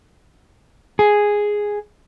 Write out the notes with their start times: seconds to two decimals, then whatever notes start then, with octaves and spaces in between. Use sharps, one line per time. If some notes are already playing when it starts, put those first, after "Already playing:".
0.99 G#4